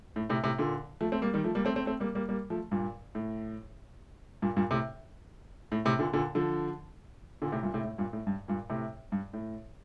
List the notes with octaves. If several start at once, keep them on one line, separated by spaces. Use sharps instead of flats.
A2
A2 C3
A2 C3
A#2 D3
F3 A3
A3 C4
G3 A#3
D#3 G3
F3 A3
G3 A#3
A3 C4
A3 C4
A3 C4
G3 A#3
G3 A#3
G3 A#3
F3 A3
G2 A#2
A2
G2 A#2
G2 A#2
A2 C3
A2
A2 C3
A#2 D3
A#2 D3
D3 F3
A#2 D3
A2 C3
G2 A#2
A2 C3
A2
G2 A#2
A2
G2
G2 A#2
A2 C3
G2
A2